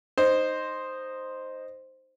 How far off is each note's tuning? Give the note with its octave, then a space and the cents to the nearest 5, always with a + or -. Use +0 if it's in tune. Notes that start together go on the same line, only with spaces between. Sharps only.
D#4 -10 C5 +0